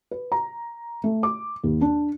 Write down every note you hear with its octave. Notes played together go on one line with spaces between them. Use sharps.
B4
A#5
A3
D6
D#2
D4